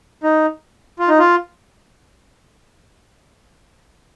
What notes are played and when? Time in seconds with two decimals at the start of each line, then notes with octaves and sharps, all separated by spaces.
0.23 D#4
0.99 F4
1.09 D#4
1.19 F4